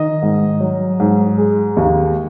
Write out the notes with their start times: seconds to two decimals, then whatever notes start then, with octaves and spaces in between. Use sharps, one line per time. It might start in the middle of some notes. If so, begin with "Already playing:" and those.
Already playing: D#3 D#5
0.22 G#2
0.60 F#3
1.00 G#2
1.38 G#3
1.77 D#2